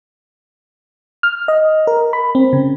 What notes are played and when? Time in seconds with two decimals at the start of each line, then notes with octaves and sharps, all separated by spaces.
1.23 F6
1.48 D#5
1.87 A#4
2.13 B5
2.35 C4
2.53 C#3